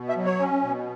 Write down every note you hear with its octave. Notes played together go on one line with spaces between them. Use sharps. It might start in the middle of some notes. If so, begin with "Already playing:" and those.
Already playing: B2
E5
F#3
C#5
C#4
B2